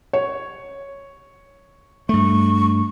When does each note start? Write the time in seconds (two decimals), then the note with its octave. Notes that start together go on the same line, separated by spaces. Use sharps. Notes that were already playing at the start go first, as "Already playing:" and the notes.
0.13 C#5
2.09 G2 A3 C#6